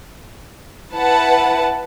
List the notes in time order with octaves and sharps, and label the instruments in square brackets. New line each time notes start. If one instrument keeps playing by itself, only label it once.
[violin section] E4 B4 F#5 A5